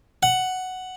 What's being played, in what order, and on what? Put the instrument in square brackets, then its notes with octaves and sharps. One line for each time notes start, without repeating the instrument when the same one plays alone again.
[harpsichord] F#5